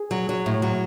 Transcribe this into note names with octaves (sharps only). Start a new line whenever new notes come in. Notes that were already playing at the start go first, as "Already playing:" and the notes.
Already playing: G#4
F#3
F#3
A2
F#3